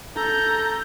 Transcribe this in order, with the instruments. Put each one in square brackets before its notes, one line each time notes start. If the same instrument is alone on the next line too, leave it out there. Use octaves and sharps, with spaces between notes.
[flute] A4 [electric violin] A#5 G6